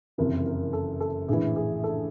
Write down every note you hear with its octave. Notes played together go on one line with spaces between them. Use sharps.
F#1 F2 C3 E3 A#4
A#4
A4
A4
A#1 A2 E3 G#4
G#4
A4